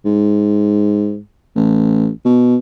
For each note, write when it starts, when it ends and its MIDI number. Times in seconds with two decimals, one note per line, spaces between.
0.05 1.19 44
1.56 2.09 33
2.25 2.56 47